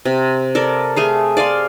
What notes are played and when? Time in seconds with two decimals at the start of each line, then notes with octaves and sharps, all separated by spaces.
0.05 C3
0.55 A4 A#4 D5
0.96 A3 G#4 F5
1.37 D5 F5 G#5 C6